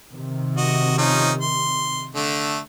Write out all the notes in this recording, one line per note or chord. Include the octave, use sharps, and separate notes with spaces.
C3 D#3
F#4 D#5
F3 C#4 D#4
C6
D3 A3